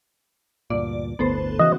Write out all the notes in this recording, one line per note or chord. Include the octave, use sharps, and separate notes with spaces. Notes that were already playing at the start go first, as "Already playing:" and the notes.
D2 G2 A#2 D5
G1 D2 A2 B3 A4 C5
C#3 E3 F#4 D#5